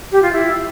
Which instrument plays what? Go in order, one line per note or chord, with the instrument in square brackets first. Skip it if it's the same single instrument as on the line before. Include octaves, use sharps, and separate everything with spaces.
[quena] G4
F4
E4